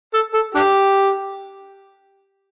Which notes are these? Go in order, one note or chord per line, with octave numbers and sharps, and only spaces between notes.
A4
A4
D4 G4